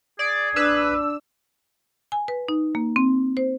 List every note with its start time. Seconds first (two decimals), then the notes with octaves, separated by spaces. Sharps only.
0.19 G#4 D5
0.56 D4 B4 E6
2.12 G#5
2.28 B4
2.49 D#4
2.75 A#3
2.96 C4
3.37 C5